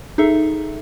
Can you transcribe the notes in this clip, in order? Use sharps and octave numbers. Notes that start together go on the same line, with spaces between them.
D#4 G#4 A4 E5